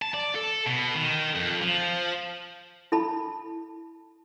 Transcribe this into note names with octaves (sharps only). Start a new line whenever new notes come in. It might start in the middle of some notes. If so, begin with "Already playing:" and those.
A5
D5
A4
B2
D#3
F2
F3
E4 A4 A5 B5